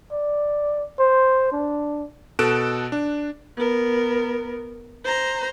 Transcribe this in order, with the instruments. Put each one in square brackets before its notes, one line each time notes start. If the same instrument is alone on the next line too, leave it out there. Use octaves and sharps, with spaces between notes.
[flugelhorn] D5
C5
D4
[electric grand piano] B2 A4 F#6 D7 E7
D4
[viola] B3 A#4
C5 A#5